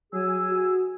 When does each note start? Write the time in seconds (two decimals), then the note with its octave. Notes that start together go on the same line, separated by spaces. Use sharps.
0.13 F#3 G#4 G#5 E6
0.49 F#4